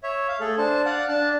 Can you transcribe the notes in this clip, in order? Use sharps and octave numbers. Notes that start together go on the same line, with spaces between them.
C#5 E5
F5
A3 G#4 A4
D4 C5 A5
D5 F5 F#5
D4 A5